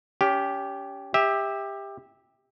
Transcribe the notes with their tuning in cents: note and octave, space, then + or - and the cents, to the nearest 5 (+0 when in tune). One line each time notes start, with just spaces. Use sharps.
C#4 +30 G4 +0
G4 +20 E5 -15